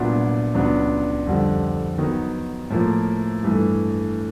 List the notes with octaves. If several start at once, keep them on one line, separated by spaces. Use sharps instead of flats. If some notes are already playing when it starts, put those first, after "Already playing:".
Already playing: C2 A#2 F#3 B3 D4
C#2 C#3 F#3 B3 D4
F2 D3 G3
D#3 F#3 B3
A2 F3 A#3
G2 E3 A3